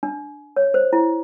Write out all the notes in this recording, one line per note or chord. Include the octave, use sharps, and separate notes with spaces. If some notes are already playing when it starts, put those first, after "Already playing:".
D4
C#5
C5
E4